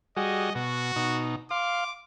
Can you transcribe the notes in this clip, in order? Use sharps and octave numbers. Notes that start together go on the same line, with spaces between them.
G3 F#4 G#4 D#5
B2 F#4
B2 D#4
F5 C6 D6